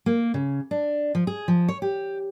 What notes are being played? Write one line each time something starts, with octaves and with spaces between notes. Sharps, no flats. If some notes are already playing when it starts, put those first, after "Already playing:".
A#3
C#3
D4
F3
G#4
F3
C#5
G4